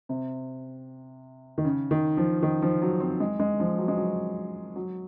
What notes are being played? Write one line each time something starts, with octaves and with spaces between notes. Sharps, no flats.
C3
D#3
C#3
D#3
F3
D#3
F3
F#3
C4
G#3
G#3
F3
F#3
G#3
F#3
F#3